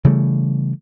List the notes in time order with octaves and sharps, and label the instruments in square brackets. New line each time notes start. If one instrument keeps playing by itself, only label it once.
[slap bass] C#3 E3 G3 A3